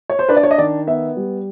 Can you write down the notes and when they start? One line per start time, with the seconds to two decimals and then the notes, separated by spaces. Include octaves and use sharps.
0.10 C#5
0.19 C5
0.29 D4 B4
0.36 D5
0.43 C#5
0.51 D#5
0.58 D#3 D5
0.87 B3 E5
1.17 G3